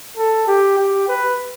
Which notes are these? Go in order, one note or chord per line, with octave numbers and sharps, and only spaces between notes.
A4
G4
G4
B4